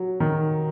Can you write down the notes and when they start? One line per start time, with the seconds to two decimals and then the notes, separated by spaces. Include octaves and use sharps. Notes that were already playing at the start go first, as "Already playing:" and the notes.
Already playing: F#3
0.20 D#3